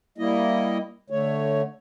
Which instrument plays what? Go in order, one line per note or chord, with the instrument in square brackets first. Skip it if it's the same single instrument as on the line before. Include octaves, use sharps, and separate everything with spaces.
[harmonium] G3 A#3 E4 D#5
D3 A3 C#5